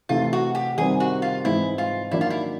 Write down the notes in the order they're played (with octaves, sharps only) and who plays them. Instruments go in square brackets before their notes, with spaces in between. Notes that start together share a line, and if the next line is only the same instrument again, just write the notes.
[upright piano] C3 E3 A3 [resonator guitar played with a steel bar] F4
[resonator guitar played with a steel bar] F#4
G4
[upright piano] C3 D#3 G3 C4 [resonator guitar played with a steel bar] G#4
[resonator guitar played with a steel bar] F#4
F4
[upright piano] G#2 E3 G#3 C4 [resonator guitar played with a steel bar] E4
[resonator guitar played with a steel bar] F4
[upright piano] D#3 F#3 A#3 D4 F#4 [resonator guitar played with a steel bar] E4
[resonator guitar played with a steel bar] F4
E4